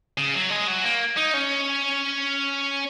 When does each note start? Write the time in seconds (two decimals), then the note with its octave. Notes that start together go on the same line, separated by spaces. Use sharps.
0.17 C#3
0.34 F#3
0.50 G#3
0.67 F#3
0.84 A#3
1.17 D#4
1.34 C#4